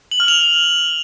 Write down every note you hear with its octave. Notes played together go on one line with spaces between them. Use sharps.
F#7
F6
F7